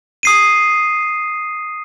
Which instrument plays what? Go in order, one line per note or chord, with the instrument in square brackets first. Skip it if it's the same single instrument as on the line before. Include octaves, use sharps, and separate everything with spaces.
[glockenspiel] D#6 C7 D#7